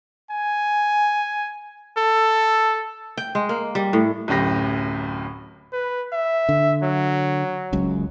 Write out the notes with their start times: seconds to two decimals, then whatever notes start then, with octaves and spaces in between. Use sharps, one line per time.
0.31 G#5
1.97 A4
3.17 G5
3.35 G#3
3.49 A#3
3.75 G3
3.93 A2
4.28 D1 F#2 A2 G4 A#6
5.73 B4
6.13 E5
6.49 D3
6.83 F#3
7.73 F#1 C#2 F#2